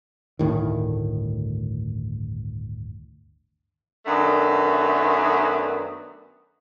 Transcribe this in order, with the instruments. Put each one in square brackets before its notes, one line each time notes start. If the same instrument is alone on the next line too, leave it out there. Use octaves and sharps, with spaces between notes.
[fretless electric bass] G1 D2 A2 D#3
[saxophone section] F#2 D#3 A3 B3 D4